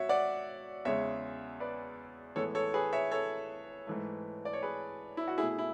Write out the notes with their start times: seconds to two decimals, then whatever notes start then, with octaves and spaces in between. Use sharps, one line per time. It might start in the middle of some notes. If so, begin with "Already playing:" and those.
Already playing: B2 F#4 C#5 E5
0.09 D5 F#5
0.85 E2 C#3 G#3 C#5 E5
1.60 B4 D5
2.36 A2 E3 G#3 B3 A4 C#5
2.55 A4 C#5
2.74 G#4 B4
2.93 C#5 E5
3.11 A4 C#5
3.87 G#2 E3 A3
4.45 D5
4.53 C#5
4.62 G#4 B4
5.17 E4
5.28 F#4
5.38 A3 E4 G#4
5.42 B2
5.59 E4